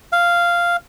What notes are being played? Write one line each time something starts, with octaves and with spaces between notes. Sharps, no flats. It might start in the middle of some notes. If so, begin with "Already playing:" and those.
F5